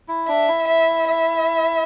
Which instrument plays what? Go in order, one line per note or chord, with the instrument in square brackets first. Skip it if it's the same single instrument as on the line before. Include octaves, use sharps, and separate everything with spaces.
[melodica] E4
[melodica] D4 [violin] E5
[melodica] E4
[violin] E5
E5